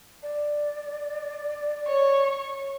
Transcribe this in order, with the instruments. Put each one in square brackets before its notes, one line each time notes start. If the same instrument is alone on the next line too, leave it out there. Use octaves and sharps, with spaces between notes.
[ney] D5
[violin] C#5 C#6